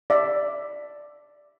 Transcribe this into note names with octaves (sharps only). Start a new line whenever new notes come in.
D5 E5